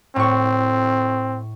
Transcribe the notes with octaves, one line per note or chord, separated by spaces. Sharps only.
A2 C4 C#6